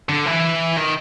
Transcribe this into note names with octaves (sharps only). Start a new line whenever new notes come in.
D3
E3
D#3